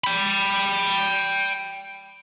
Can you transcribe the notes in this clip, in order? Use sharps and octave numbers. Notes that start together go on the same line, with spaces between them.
G5 B5